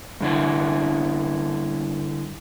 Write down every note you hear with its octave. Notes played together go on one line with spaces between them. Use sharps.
G2 D3 E4